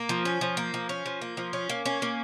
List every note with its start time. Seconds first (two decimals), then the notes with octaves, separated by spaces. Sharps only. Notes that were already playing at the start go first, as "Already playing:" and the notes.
Already playing: A#3
0.09 F3
0.25 C#4
0.41 F3
0.57 A#3
0.74 F3
0.89 C#4
1.06 F3
1.21 A#3
1.37 F3
1.53 C#4
1.69 A#3
1.85 C#4
2.02 A#3